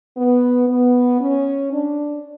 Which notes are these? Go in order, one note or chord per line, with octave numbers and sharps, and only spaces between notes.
B3
B3
C#4
D4